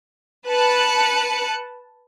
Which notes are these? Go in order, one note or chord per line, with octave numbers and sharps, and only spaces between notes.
B4 A5 F#6 C#7